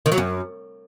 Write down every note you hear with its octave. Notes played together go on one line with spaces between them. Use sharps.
D#3
F#3
F#2